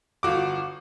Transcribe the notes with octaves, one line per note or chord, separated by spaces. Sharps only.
G1 F4 F#4 D6